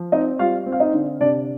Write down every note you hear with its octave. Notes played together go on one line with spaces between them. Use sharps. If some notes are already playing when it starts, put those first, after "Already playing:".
Already playing: F3
C4 D#4 D#5
G3 F4 F5
C4
F5
D#4 D#5
D3
C3 D4 D5